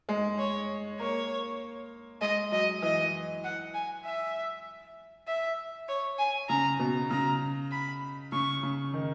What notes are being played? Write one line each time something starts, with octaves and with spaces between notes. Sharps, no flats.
G#3
C#5
A#3 C#5
G#3 D#5
F#3 D#5
E3 D#5
F#5
G#5
E5
E5
C#5
G#5
C#3 A#5
B2
C#3 A#5
B5
C#3 C#6
C#3
D#3